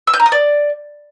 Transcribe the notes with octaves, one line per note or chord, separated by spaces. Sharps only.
E6
G6
A#5
D#6
D5